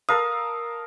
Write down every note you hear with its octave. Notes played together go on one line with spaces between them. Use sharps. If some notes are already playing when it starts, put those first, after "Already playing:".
A4 A#4 F5 D#6